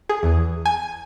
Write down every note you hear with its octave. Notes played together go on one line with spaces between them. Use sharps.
G#4
E2
G#5